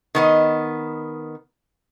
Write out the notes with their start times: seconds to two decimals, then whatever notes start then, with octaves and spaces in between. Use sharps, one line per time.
0.15 D#3 B3 D#5